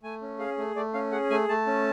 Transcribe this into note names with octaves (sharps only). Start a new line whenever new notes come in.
A3 G#5
C#4
G#4 F5
A3
A3 D5
C#4 F5
G#4 F#5
A3 G#5
A3 A5
C#4